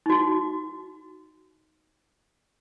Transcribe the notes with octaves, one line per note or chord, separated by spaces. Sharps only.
D#4 F#4